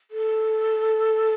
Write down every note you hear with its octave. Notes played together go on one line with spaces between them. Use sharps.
A4